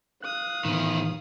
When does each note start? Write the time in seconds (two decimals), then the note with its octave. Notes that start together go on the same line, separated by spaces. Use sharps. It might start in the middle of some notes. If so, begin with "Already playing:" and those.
0.22 F5 D#6 F#6
0.65 A2 D#3 E3 B3